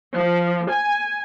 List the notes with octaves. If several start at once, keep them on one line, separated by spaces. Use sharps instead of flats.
F3
G#5